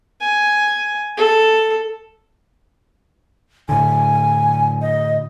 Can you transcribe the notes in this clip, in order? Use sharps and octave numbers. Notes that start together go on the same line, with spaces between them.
G#5
A4
A2 D3 G#5
D#5